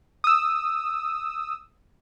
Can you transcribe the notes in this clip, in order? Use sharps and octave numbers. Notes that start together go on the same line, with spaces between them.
D#6 E6